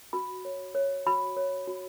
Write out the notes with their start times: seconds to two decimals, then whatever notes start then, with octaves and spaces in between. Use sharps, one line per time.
0.13 F#4 B5
0.45 C#5
0.75 C#5
1.06 F#4 B5
1.37 C#5
1.68 F#4